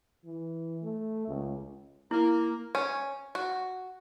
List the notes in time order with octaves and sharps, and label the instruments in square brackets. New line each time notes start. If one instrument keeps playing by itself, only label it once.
[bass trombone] E3
A3
C#2
[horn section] A#3 [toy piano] E4
[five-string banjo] C#4
F#4